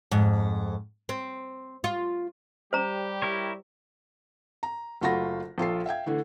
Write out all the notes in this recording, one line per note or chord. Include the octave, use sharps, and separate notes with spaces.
F2 G#2
C4
F4
G3 G4 C5 A#5
E4 A#4 C#5
A#5
F#1 A3 F4 F#4 B5 A#6
A#1 F4 A4 C7
E5 F5 G5 G#6
D3 E3 A3